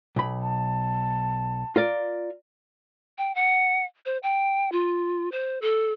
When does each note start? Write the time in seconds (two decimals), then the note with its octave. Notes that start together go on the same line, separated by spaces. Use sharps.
0.16 B1 B5
0.40 A5
1.76 F4 A#4 D5
3.18 G5
3.35 F#5
4.06 C5
4.23 G5
4.72 F4
5.32 C5
5.62 A4